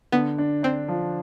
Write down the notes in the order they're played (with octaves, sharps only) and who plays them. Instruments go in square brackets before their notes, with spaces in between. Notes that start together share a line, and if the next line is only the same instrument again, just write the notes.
[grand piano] D3 [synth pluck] B3
[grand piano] D4
[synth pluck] C4 [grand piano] D4
[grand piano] F3